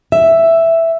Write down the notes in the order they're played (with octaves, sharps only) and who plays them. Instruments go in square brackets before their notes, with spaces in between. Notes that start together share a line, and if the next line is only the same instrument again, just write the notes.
[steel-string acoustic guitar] E5